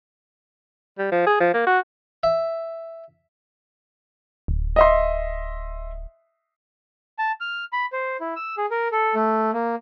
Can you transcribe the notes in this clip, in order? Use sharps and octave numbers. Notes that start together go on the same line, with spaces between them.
G3
F3
G#4
F3
A#3
F#4
E5
D1
D#5 E5 C6
A5
F6
B5
C5
E4
E6
G#4
A#4
A4
A3
A#3